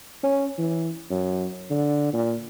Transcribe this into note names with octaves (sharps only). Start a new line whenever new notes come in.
C#4
E3
F#2
D3
A#2